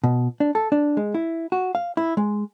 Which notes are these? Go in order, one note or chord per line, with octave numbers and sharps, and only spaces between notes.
B2
D4
A4
D4
G#3
E4
F#4
F5
E4
G#3